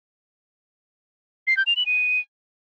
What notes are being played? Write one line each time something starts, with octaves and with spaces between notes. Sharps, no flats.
C7
G6
F7
F#7
D#7